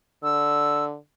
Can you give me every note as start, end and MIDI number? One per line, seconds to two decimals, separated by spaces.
0.23 0.96 50
0.23 0.85 88